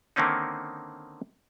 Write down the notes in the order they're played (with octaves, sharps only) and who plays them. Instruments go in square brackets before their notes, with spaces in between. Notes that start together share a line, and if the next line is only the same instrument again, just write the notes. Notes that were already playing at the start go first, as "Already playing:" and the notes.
[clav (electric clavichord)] D3 D#3 A#3 C4 C#4 D#4